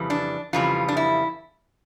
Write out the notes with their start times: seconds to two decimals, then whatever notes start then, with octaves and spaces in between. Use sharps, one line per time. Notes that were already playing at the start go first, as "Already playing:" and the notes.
Already playing: F2 C#3 E3 G3
0.10 D4
0.53 F2 C#3 E3 G3 F4
0.88 D4
0.97 E4